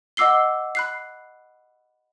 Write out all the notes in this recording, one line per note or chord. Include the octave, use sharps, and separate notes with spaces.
D#5 F#5 D6 E6 C7 G7
B5 F#6 C7